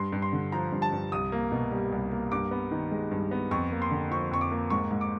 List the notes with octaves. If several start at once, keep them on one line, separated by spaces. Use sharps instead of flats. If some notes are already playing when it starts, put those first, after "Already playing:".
Already playing: G2 C6
G2
C6
D3
F3 A#5
G2
A5
G2
C2 D#6
A#3
B2
G3
C2
A#3
G2 D6
B3
D#3
G#3
G2
B3
F2 C#6
A#3
C6
D3
F3 C#6
F2 C#6
D6
A#3
G#2 C#6
G#2
D6